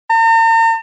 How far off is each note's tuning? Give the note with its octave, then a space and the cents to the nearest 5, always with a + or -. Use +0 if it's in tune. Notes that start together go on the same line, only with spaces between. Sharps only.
A#5 -45